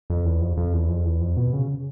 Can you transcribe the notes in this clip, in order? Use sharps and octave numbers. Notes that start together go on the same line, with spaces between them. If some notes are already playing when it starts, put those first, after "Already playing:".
F2
E2
F2
F2
E2
F2
E2
F2
B2
C#3